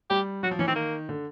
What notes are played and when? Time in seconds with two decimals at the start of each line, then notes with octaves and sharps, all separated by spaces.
0.10 G3 G4
0.43 F#3 F#4
0.51 F3
0.59 E3 C#4
0.68 D#3 C4
0.76 A#3
1.09 D3